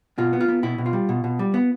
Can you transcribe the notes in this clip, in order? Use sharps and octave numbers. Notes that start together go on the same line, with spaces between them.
B2 F4
B3
F4
B3
B2 E4
B2
F4
G3
B2
B2
G3
B3